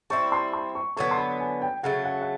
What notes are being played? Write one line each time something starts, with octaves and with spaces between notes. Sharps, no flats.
G3 C4 E4 C#6
C6
C6
C#6
D3 F#3 B3 C#6
C6
B5
G#5
G5
C#3 F#3 A3 F#5
F#5
F#5